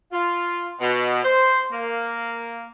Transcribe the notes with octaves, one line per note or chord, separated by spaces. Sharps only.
F4
B2
C5
A#3